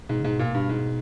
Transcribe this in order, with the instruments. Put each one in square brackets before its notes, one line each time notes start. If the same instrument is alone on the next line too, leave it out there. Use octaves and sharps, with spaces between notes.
[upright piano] G#2 [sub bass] B2
[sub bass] C#3
[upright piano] G#2 [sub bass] B2
[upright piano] A#2
G2
G#2